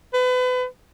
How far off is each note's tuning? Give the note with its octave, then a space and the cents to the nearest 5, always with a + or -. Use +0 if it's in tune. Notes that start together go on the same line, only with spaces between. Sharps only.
B4 +35